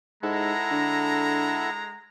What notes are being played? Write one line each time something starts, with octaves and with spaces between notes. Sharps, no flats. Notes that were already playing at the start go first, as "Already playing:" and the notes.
G#2 G#3 E4 A4 F#5 A#5
D3